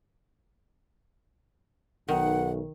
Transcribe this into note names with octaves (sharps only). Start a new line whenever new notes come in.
B1 D#3 F#5